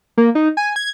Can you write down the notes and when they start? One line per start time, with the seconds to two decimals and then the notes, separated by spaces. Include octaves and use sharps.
0.17 A#3
0.35 D#4
0.57 G#5
0.76 G#6